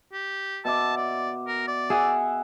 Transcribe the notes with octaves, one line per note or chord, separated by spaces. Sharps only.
G4
B2 E5 A5 D6
D5
A#4
D5
G#4 E5 F#5